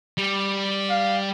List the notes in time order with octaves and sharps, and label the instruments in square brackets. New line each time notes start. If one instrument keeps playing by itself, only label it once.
[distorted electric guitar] G3
[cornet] F5